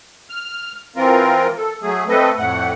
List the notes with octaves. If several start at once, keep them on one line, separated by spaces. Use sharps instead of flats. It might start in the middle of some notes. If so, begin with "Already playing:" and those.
F6
E3 C4 F4 A#4
A4
F#3 A3 G#4
A3 C4 A4 B4 D#5
F2 A2 A3 F#5